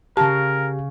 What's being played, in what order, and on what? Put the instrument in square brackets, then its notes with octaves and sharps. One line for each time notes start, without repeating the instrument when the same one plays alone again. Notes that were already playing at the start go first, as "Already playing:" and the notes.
[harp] C#3 C#4 F5 [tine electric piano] G4 [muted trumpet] A#4 [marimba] A5